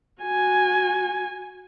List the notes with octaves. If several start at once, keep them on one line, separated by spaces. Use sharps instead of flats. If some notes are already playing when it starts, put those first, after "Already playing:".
F#4 G#5